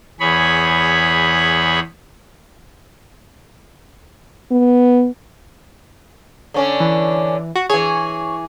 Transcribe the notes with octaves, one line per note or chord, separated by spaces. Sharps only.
E2 G#4 C#5 B5
B3
D3 C#4 D4
E3
F#4
E3 G#4 C#5